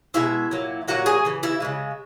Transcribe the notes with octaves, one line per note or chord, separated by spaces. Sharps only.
B2 G#3 E4 E5
A#2 F#3
A#2 F#3 F#4 F#5
G#4 G#5
C#3 E3
E4 E5
C#3 E3 G#3